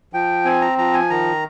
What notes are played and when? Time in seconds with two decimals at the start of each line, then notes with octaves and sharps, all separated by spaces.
0.13 F3 G5
0.45 C4 G#5
0.61 A#5
0.78 F3 A#5
0.94 G#5
1.10 D#3 A#5